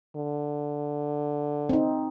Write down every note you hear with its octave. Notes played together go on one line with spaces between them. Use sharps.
D3
C4 D#4